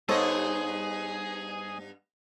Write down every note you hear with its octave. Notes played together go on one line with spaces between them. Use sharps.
G2 B3 D#4 G#4 A4 C5 C#5 D#5